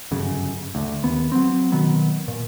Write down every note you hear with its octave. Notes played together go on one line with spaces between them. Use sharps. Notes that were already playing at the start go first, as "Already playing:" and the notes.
G1 F#2 C#3
D2 D3
D#2 B3
F#3 C4
B2 D#3 F#3 B3
A#2